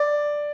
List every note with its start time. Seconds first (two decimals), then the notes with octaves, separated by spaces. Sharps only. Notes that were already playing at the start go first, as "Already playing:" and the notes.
Already playing: D5